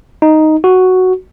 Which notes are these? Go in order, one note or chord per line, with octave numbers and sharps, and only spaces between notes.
D#4
F#4